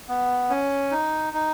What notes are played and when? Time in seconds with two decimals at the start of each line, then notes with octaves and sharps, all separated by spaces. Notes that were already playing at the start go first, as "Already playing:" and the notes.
0.09 B3
0.50 C#4
0.91 D#4
1.33 D#4